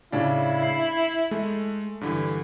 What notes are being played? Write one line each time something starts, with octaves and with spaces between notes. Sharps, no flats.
A2 C#3 D4 E4
C7
G#3 A3
G2 D3 E3